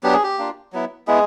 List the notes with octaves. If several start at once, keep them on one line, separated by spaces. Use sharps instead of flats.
F#3 B3 D4 G4
G#4
G4
A#3 D4 F4
F#3 B3 E4
G#3 B3 E4 G#4